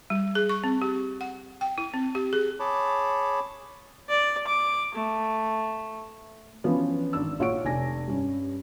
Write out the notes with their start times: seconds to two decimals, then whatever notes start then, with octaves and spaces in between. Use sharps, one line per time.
0.10 G3
0.35 G#4
0.49 C#6
0.64 C4
0.82 G4
1.21 F#5
1.61 G5
1.78 E4
1.94 C4
2.15 G4
2.33 G#4
2.60 G#4 C#5 A5 B5 D6
4.10 D5
4.48 D6
4.95 A3
6.64 E3 F3 B3 C#4 D4
7.13 G#1 D4 E6
7.39 A#1 F4 C#5 F#5 C#6 D7
7.65 F1 D5 G#5 A#6
8.08 G2 C#4